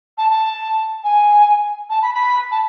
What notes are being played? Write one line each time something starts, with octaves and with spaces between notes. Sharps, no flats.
A5
A5
G#5
A5
B5
B5
A5